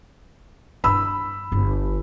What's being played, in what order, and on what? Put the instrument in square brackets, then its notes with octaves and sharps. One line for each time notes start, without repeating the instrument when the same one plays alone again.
[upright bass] G2 D4 [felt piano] B5 E6
[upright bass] G1